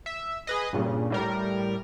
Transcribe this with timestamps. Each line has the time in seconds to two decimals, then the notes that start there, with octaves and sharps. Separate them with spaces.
0.06 E5
0.47 G#4 B4 D#5
0.73 G2 A#2 C#3
1.10 A2 G3 A#4